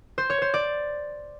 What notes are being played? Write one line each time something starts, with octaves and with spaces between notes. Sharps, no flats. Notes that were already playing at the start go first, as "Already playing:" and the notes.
C5
C#5
C5
D5